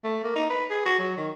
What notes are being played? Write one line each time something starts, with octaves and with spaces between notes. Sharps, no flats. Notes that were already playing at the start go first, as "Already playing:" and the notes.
A3
A#3
D#4
B4
G#4
F#4
F#3
D#3